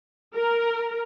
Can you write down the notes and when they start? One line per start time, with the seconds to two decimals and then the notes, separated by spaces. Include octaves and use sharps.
0.34 A#4